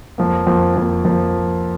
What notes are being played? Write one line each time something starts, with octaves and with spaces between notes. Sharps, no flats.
F2 F3 A#3
F2 F3 A#3
F2 F3 A#3
F2 F3 A#3